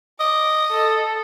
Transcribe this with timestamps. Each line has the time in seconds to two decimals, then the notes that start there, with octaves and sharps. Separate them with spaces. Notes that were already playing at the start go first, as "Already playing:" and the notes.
0.20 D#5 D6
0.72 A4